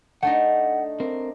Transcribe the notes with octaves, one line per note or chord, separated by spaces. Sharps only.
A3 D4 D#4 F#5
C4 A#4